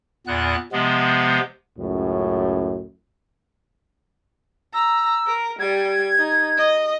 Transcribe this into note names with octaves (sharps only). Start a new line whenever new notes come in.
E2 A#2 B3 F#6
C3 F3 G#3 B3
C#2 F#2 A2
A#5 E6
A#4
G3 G#6
D#4
D#5